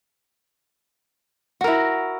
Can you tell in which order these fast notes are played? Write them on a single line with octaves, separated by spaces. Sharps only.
F#4 A#4 E4